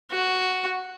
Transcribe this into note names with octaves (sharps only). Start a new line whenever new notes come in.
F#4